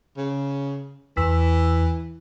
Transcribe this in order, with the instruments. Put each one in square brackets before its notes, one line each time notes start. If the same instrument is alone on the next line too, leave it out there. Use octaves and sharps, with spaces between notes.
[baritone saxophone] C#3
[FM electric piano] E2 E6 B6 [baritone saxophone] E3